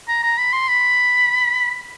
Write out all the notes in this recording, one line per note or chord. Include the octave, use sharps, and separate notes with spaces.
A#5
A#5
B5
C6
B5